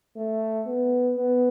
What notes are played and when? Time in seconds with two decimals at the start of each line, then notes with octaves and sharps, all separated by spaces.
0.16 A3
0.66 B3
1.17 B3